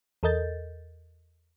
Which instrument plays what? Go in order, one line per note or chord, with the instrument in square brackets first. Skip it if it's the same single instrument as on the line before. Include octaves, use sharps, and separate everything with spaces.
[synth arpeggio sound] E2 A4 A#4 D#5 G6 A6